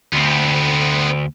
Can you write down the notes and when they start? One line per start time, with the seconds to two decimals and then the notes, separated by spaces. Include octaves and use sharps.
0.13 D2 B3 C4